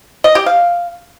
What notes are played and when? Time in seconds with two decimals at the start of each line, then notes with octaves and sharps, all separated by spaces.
0.24 D#5
0.35 G4
0.46 F5